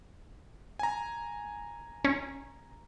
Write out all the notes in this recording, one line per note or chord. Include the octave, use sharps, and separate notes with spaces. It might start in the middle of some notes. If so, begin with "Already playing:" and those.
G#5 A#5
C#4